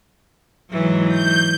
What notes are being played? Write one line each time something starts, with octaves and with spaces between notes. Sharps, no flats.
G#2 E3 F#3
G6